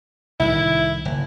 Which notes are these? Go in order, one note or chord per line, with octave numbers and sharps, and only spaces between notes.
C2 A2 D#3 E4
F#1